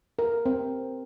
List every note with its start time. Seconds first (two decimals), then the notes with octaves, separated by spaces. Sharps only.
0.19 A#4
0.46 C4